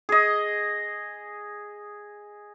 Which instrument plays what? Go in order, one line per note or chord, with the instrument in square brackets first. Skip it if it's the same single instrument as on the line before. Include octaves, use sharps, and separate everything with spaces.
[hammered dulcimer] G#4 D#5